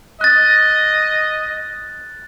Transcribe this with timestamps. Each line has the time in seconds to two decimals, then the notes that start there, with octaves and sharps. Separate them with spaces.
0.21 D#5 F#6 A6